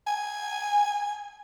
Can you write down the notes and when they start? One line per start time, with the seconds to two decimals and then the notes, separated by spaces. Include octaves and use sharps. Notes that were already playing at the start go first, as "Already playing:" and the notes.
0.07 G#5